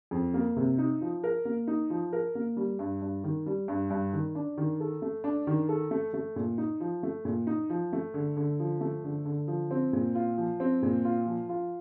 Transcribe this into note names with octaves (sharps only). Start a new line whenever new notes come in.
F2
A#3
C3
D#4
F3
A#4
A#3
D#4
F3
A#4
A#3
G3
G2
G2
D#3
G3
G2
G2
D#3
D4
D#3
A4
A3
D4
D#3
A4
A3
A3
A#2
D#4
F3
A3
A#2
D#4
F3
A3
D3
D3
F3
A3
D3
D3
F3
C4
A#2
F4
F3
C4
A#2
F4
F3
F4